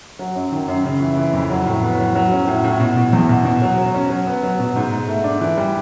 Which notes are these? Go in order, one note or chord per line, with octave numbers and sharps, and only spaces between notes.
F#3
F#2
D#3
F#2
C#3
E3
E3
F2
F#3
A2
B3
F#3
F#3
C#4
A2
A2
B2
B2
E2
B2
B2
F#3
F#3
C#4
F#3
B3
F#3
B2
G#2
G#2
A3
D4
E3
G3